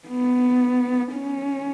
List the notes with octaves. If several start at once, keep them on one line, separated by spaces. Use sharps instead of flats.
B3
C#4